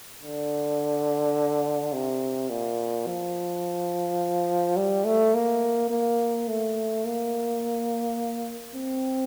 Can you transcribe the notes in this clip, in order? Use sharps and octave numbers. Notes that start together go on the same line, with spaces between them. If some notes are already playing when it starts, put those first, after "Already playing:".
D3
C3
A#2
F3
G3
A3
A#3
A#3
A3
A#3
C4